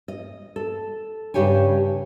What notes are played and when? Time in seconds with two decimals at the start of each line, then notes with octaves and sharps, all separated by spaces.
0.08 D#5
0.56 A4
1.34 G2 C#3 G4 C#5 G#5